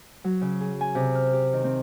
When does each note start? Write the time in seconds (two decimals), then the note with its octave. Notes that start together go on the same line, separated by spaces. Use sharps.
0.24 F#3
0.41 C#3
0.61 G#4
0.81 G#5
0.95 C3
1.15 F6
1.33 G4
1.53 D#3
1.64 C4